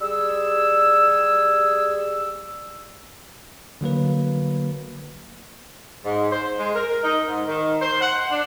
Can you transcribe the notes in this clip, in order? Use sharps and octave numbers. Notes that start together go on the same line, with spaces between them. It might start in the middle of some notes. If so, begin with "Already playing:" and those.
G3 G#4 E6
D3 F#3 A#3 B4
G#2
C5
G#3
A#4
D#4
G#2
D#3
C5
F#5
D4